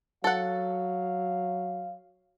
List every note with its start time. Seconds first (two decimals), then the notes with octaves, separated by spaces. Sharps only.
0.24 F#3 A4 F5 F#5